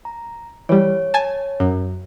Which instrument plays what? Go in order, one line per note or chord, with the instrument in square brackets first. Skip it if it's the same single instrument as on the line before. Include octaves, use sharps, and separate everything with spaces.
[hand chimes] A#5
[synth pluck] E3 G3 [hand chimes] C#5
[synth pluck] G#5 A5
F#2